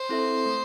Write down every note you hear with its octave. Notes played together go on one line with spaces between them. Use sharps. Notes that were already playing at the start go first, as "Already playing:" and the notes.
Already playing: C5
C4 E4 A4 E5
A3